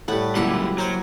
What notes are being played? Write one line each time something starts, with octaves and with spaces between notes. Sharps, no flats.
A2 G3 A3 F#5 B5
C#2 A#2 F#3 G3 A#3 E4 G4 F#5
F#3 A#4 C5